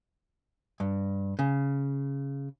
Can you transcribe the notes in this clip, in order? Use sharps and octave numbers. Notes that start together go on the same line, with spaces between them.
G2
C#3